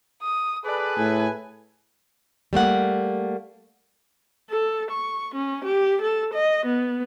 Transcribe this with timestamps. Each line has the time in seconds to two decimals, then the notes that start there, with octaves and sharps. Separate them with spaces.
0.22 D#6
0.66 G#4 A4 B4 D5
0.98 A2 G#5
2.53 G3 A3 A#3 F#5
4.50 A4
4.90 C#6
5.34 C#4
5.65 G4
6.01 A4
6.34 D#5
6.66 B3